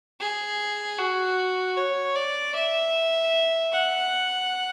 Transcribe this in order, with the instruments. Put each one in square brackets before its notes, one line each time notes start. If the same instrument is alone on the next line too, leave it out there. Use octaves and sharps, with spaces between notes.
[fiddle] G#4
F#4
C#5
D5
E5
F#5